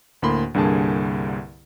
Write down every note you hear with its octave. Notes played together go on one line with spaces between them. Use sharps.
D2 A2 A#3 B5 C6
C2 G2 D3 A#3 G#4 A5